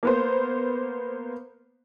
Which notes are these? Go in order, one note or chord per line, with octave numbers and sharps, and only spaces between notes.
A#3 B3 C5